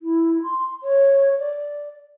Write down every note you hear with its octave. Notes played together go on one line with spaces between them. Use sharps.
E4
C6
C#5
D5